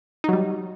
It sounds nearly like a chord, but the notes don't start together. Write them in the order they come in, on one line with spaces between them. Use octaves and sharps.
D#4 F#3 G3